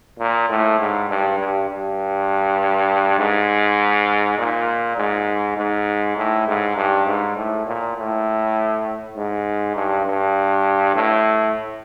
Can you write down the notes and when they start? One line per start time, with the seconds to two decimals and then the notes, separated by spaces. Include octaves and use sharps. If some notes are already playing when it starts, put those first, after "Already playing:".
0.19 A#2
0.49 A2
0.80 G#2
1.09 G2
1.39 G2
1.69 G2
3.18 G#2
4.38 A#2
4.97 G#2
5.57 G#2
6.17 A2
6.47 G#2
6.76 G2
7.06 G#2
7.36 A2
7.66 A#2
7.97 A2
9.16 G#2
9.75 G2
10.06 G2
10.95 A2